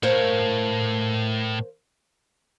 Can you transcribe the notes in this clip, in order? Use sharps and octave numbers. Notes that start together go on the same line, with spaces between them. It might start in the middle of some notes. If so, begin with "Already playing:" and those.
A2 A#4 C5 C#5 F5